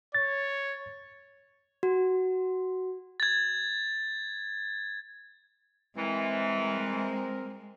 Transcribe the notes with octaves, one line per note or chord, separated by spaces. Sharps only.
C#5 A6
F#4
G#6 A6
E3 G#3 C4 A#4